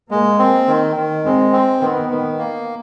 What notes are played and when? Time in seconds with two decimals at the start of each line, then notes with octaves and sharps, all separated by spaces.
0.10 G#3 A#3
0.39 C4
0.67 D#3
0.96 D#3
1.25 G#3 C4
1.53 C4
1.81 D#3 B3
2.10 D#3
2.39 A#3